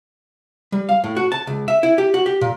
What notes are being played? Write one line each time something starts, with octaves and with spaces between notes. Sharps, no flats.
G3
F5
A2
F#4
A5
C#2
E5
E4
G4
F#4
G4
A#2